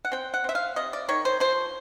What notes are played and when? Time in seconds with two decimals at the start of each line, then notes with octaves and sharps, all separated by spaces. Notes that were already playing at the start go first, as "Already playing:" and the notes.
0.05 F#5
0.12 C4 G5
0.34 F#5
0.44 C4 E5
0.55 F5
0.76 C3 D#5
0.93 D5
1.09 D#3 C#5
1.25 C5
1.40 F3 C5